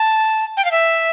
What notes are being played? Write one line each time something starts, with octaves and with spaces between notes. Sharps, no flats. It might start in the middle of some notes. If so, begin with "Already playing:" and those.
Already playing: A5
G5
F5
E5